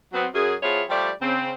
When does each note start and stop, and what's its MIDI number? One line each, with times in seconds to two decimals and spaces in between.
0.13 0.26 54
0.13 0.26 59
0.13 0.26 60
0.34 0.55 42
0.34 0.55 68
0.62 0.82 53
0.62 0.82 59
0.62 0.82 64
0.62 0.82 65
0.62 0.82 68
0.62 0.82 73
0.89 1.10 53
0.89 1.10 55
0.89 1.10 57
0.89 1.10 67
0.89 1.10 74
1.22 1.52 49
1.22 1.52 60